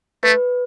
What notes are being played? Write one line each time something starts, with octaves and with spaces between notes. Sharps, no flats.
A3 B4